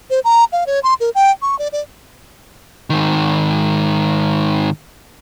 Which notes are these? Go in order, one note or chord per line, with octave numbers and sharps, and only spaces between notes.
C5
A#5
F5
C#5
C6
A#4
G5
C#6
D5
D5
G#2 D#3